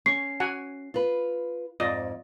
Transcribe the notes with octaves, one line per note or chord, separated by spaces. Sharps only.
C#4 C#6 C7
F#4 F#5 G#5
F4 B4
F2 G#2 F4 D5 D#5